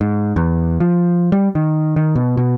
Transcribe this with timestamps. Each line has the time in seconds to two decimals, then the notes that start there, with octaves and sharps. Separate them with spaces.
0.01 G#2
0.36 E2
0.80 F3
1.32 G3
1.55 D#3
1.96 D#3
2.16 B2
2.37 B2